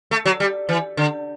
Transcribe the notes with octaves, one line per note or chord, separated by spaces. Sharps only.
A3
F#3
G3
E3
D3